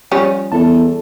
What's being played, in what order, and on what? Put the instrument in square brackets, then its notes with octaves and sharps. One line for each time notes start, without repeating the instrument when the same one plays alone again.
[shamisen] F3 G3 C#4
[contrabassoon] E2 [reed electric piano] A4 A5